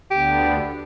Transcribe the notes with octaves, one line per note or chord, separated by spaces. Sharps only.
D2 D3 B3 D4 G4